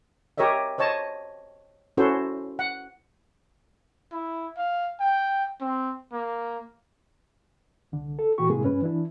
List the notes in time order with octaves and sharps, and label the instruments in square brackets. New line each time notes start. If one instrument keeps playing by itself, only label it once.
[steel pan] G4 A#4 C#5 D#5 E5
C5 C#5 D#5 A5
C#4 E4 F#4 A4 C5
F#5
[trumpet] E4
F5
G5
C4
A#3
[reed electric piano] C2 D3
A4
A#2 E3 F#4 G4 C#6
A2 C3 G#3 A#3 E4 G#4
G2 C#4 B4
E3 D4 E4